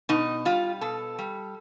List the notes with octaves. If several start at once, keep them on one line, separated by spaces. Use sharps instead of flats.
B2 D#4
G3 F4
B2 A4
G3